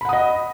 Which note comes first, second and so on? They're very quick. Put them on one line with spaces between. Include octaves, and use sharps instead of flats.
B5 F#5 D#6 D#5